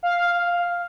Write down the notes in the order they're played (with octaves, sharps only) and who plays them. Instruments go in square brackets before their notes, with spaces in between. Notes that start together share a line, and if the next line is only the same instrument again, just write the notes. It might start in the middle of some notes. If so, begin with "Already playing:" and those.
[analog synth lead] F5